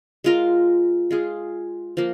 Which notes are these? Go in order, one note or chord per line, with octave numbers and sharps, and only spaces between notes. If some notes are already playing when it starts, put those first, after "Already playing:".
G#3 F4 A#4
G#3 F4 G#4
F3 A#3